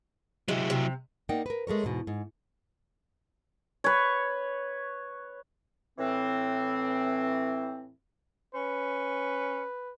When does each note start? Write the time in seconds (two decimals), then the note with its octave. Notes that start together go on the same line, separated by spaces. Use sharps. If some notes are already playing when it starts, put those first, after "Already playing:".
0.48 C3 F#3 G#3 E4
0.70 C3
1.29 A#3 D#4 D5 F#5 G5
1.46 A#4 B4
1.67 G#3 A3 A#4 C#5
1.84 E2 G#2 B2
2.07 G#2
3.84 B4 C#5
5.98 A2 E3 C4
8.55 C#4 B4